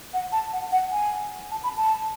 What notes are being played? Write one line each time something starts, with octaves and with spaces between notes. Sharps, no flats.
F#5
A5
F#5
F#5
G#5
A5
B5
A5